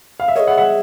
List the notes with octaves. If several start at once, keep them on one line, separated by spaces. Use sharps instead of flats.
F5
E5
A#4 C#5 D#5
G#4
E5 F#5
E5 F#5